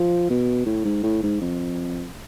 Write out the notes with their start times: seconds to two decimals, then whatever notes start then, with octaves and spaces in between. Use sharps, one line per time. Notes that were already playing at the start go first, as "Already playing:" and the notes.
Already playing: F3
0.30 B2
0.66 A2
0.85 G#2
1.03 A2
1.23 G#2
1.41 F2